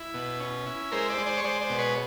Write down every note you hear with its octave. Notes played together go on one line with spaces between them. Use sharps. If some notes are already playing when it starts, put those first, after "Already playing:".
Already playing: E4
B2
C#4
E4
G#3 A#4 C5
C5 D5
G#3
C5 D5
C#5
G#3 C5 D5
C5 D5
B2
B4 C#5